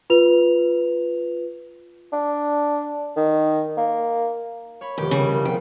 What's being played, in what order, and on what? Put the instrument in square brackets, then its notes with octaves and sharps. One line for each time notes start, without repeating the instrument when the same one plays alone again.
[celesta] F4 B4 F7
[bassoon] D4
D#3
A#3
[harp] C#5 B5
[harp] F1 E2 D#3 [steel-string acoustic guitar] G4
[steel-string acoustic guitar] C#3 G3
[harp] F#1
[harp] F3 B3 C4 [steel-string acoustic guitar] G5